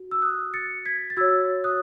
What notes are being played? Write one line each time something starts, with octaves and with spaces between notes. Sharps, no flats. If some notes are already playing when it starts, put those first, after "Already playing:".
Already playing: F#4
E6
D#6 F#6
A6 C#7
G#6 B6
A6
F#4 C#5 E6 G#6
D#6 F#6